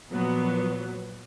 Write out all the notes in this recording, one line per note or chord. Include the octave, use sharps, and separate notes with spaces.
A#2 F3 F#3 B3